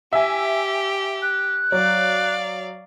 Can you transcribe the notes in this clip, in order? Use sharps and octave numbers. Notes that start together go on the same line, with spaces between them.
G4 E5 G#5
F#6
F#3 D5 F5